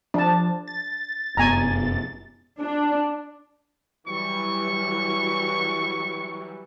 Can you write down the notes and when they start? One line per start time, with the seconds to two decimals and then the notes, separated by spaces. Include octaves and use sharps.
0.14 F3 D4 A5
0.68 A6
1.37 F1 F#2 B3 G#5 A#5
2.61 D4
4.07 E3 F#3 G3 C#6